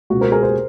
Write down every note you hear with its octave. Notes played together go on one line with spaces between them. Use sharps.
C#2 B2 F#4
A#4 C5
G#4 A#4
A#4 C5